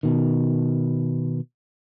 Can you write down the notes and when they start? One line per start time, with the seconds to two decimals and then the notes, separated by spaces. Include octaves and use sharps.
0.03 B2 D#3